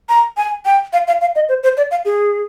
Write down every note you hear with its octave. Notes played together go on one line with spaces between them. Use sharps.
A#5
G#5
G5
F5
F5
F5
D#5
C5
C5
D5
F5
G#4